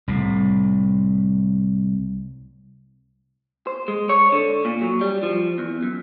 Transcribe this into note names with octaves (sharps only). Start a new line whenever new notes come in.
C2 A2
C5
G#3
C#5
D3
A#2
F#3
G3
F3
E2
F#2